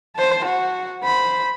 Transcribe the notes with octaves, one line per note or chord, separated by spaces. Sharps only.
C5 A5
F#4
C5 B5